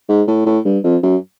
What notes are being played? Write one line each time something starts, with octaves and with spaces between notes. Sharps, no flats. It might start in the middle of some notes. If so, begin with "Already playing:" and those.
G#2
A2
A2
G2
F2
F#2